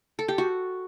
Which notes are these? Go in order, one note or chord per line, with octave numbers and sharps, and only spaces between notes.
A4
G4
F#4